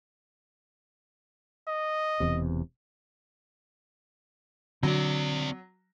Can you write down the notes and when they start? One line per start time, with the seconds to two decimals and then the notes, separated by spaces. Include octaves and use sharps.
1.68 D#5
2.20 E1 E2 C3
4.83 D3 F#3 C4 D5